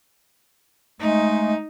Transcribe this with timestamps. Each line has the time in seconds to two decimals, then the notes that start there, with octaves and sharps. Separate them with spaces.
1.01 G#3 A3 D#4